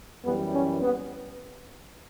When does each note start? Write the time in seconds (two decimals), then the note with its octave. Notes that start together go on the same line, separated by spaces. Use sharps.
0.24 F#2 E3 G3 B3
0.53 C#4
0.82 B3